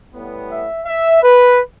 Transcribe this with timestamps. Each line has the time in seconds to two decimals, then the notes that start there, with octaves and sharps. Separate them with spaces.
0.13 A2 G3 B3
0.50 E5
0.86 E5
1.22 B4